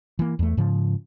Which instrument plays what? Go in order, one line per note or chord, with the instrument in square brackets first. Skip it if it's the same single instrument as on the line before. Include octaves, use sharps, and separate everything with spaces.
[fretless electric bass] E3 A#3
E2 A3
G#2 C#3 F3